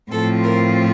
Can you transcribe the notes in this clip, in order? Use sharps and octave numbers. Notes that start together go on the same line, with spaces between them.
A2 F3 C4 F4 A4
A#4